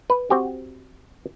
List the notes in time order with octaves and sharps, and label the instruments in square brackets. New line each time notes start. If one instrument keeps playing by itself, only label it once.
[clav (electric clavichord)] B4
C4 F#4 G4